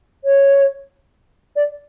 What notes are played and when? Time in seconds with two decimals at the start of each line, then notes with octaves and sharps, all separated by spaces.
0.24 C#5
1.56 D5